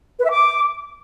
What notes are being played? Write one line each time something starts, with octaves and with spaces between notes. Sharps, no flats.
B4
E5
D6